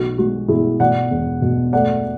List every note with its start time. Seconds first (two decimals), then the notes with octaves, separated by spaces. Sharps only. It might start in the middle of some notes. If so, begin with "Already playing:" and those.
Already playing: B1 F#4
0.18 G#3 F#4
0.48 B2 E4 G#4
0.80 B2 D5 F#5
1.11 E1
1.42 B2
1.73 A3 D5 F#5